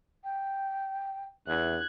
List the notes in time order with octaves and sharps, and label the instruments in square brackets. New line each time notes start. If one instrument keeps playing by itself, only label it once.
[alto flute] G5
[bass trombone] E2 [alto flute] E5 [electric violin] F#6 G#6